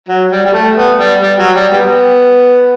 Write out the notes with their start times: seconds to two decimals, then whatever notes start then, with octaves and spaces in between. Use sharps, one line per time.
0.08 F#3
0.31 G3
0.45 G3
0.53 A3
0.77 B3
0.98 G3
1.22 G3
1.38 F#3
1.55 G3
1.73 G3 B3